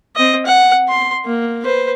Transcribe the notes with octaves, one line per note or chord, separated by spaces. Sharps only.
C4 D#5
F#5
C6
A#3
B4 C5